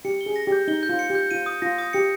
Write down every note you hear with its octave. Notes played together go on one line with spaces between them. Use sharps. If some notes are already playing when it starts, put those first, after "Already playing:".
G4 C#7
G7
G#4
A#6
G4
G6
D#4 G7
G6
F4
C#7
G4
G6
F4 D#7
D#6
F4 A#6
D#6
G4 C#7